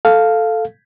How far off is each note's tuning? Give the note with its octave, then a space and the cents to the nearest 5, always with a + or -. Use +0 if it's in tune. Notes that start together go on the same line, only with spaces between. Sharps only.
A4 +0 F5 +0